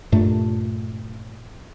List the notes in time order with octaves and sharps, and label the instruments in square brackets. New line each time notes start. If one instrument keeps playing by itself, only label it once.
[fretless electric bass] G2 A#2 A3